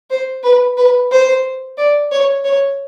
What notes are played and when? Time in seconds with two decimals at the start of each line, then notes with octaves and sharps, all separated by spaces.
0.10 C5
0.43 B4
0.77 B4
1.11 C5
1.78 D5
2.11 C#5
2.45 C#5